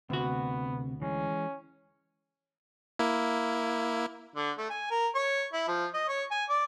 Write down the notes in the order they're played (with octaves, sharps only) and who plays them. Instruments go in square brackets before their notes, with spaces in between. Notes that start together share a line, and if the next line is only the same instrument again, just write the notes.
[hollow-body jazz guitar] D2 F#4 [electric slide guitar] C3 [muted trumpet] B3
[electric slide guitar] E3 G#3 [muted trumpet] C#4
[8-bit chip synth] A#3 E4
[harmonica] D3
A3
G#5
A#4
C#5
E4
F3
D#5
C#5
G#5
D5